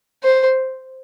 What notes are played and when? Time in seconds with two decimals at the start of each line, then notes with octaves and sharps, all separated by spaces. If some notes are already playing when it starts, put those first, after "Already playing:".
0.23 C5